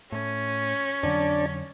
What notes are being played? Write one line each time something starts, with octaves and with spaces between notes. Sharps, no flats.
A2 C#4
F2 D3 F#3 D4 D5 A5